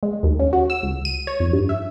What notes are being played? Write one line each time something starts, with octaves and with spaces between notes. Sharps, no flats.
G#3
D#2
C#4
F#4
E6
C#2
D#7
C#5
F2
G2
E5